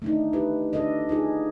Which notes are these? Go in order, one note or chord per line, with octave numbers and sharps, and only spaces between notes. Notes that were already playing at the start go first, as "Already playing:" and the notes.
A3 D4 D#4
E4 G4 B4
D4 A4 D#5
D#4 F4 G#4